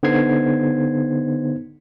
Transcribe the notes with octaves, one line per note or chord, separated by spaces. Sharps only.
D3 B3 D#4 C5 G#6 C7